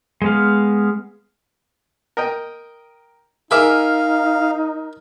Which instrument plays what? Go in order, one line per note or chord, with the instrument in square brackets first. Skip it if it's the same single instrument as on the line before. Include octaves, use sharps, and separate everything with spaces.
[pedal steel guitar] G#3 B3 F5
[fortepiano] A#4 D#5 G5
[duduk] D#4 [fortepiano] G#4 E5 D6 [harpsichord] A#4 B5 [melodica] F5